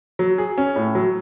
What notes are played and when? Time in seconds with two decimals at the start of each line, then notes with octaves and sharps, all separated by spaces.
0.19 F#3
0.38 G#4
0.58 C#4
0.76 A2
0.95 F#3